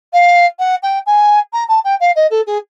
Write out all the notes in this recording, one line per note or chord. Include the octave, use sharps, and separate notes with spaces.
F5
F#5
G5
G#5
A#5
A5
G5
F5
D#5
A4
G#4